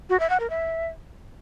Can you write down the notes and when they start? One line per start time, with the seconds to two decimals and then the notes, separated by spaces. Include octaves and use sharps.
0.10 F#4
0.20 E5
0.30 F#5
0.40 A#4
0.50 E5